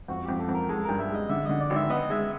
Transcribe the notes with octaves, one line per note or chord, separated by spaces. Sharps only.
F2 F#4
F2 G4
A4
F2
A#4
G#3 A4
G2 A#4
E5
G#3 D#5
D3 E5
D3 D#5
D5
G#1
E5
B3 D#5
G#3 E5